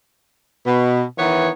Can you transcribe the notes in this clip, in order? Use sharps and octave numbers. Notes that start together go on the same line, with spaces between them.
B2
D#3 E3 B3 C#5